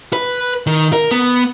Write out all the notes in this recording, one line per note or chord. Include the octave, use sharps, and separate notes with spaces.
B4
D#3
A#4
B3